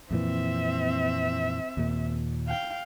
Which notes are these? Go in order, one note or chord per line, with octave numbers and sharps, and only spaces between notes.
F2 A#2 E3 C4 E5
D#2 A#2
F5 G5